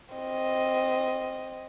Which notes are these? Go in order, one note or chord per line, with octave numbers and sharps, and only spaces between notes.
C4 D#5